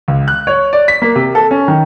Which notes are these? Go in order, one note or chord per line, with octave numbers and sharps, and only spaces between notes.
C#2
F#6
C#5
D5
B6
A#3
C3
A4
C#4
D#3